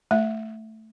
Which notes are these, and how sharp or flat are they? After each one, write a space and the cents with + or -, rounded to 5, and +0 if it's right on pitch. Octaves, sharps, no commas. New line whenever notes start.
A3 +0 E5 +0